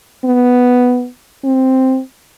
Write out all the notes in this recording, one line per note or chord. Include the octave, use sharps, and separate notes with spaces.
B3
C4